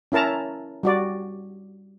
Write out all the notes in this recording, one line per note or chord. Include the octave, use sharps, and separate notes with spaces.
C#4 E4 A#4 A5 A#5
G3 F#4 D5